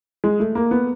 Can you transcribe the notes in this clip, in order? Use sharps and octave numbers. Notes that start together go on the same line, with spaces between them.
G#3
A3
A#3
B3